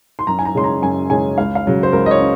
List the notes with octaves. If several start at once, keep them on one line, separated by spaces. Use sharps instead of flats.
C6
F#2 A#5
G#5
A#5
C#3 G#3 C#4 C6
A#5
F#2 G#5
C#3 G#3 C#4 G#5
C#2 F5
F5
C#3 F#3 C#4
C5
C#2 A#4
D#5
C#5
C#4